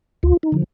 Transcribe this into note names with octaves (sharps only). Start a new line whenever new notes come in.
D2 F4
D#4
D3 F3